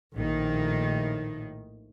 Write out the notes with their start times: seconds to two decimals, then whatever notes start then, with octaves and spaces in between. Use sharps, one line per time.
0.15 A#1 A2 D#3